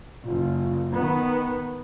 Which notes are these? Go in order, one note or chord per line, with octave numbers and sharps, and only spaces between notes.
F#1 F4
D#3 B3 B5